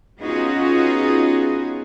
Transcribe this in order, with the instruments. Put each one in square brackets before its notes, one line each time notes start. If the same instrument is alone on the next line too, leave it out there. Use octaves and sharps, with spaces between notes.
[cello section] B3 C#4 D#4 F4 F#4 G#4